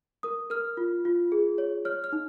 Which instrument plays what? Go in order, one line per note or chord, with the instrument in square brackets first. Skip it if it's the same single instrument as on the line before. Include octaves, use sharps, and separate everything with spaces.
[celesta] A#4 D#6
A#4 F6
F4
F4
G#4
C#5
C#5 F6
F6
D#4